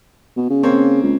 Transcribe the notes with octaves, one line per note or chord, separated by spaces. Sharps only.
B2
C#3
A#3 C4 C#5
C#2